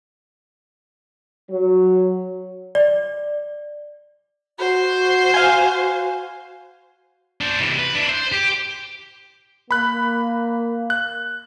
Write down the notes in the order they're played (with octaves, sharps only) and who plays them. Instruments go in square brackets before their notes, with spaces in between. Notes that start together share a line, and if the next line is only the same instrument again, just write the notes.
[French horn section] F#3
[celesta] D5
[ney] F#4 [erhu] C5
[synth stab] F5 G#5
[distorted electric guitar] D4 C5
C3 E3
B4
D4 E4
C5
G4
[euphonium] A#3 [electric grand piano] B5 F#6
[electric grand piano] F#6